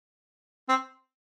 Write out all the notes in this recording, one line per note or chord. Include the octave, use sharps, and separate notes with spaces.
C4